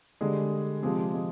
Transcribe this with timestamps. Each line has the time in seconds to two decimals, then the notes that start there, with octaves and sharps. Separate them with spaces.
0.21 D3 G3 G#3 G#4
0.82 C3 F3 G#3 G#4
1.14 G#3 G#4